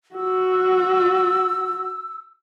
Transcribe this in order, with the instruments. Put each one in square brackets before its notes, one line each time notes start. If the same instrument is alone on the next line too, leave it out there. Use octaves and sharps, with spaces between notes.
[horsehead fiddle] F#4 [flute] E6